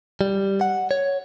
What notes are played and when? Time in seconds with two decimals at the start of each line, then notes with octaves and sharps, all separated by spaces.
0.21 G3
0.61 F#5
0.91 C#5